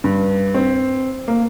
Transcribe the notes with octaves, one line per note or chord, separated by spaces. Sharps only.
G2
C4
A#3